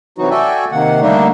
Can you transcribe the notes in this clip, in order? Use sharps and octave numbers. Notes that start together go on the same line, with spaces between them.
C3 E3 F#3 D#4 F#4
F#4 A4 D5 E5 G5 G#5
C3 D#3 A#3 F#5
D3 G3 A3 A#3 D4 D#4